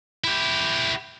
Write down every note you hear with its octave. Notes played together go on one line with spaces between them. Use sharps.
E4 G4